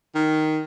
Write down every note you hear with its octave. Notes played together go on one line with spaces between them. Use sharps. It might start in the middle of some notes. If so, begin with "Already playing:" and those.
D#3